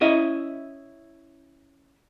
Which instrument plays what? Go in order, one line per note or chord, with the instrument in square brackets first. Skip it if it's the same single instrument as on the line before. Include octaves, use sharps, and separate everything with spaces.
[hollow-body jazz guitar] C#4 E4 D#5 E5